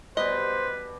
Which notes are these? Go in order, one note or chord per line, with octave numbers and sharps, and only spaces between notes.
B2 G3 B4 C5 D#5